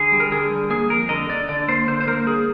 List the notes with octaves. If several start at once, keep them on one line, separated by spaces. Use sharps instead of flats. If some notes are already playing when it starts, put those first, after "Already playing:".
Already playing: D3 G#4
G3
A#4
D3 G#4
G3
A#3 G#4
F2 A#4
D3 D#5
D3 D5
D3 D5
A#3 C5
D3 C5
C5
A#3 A#4
G3 G#4